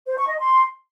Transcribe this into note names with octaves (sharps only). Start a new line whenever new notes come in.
C5
C#6
D#5
C6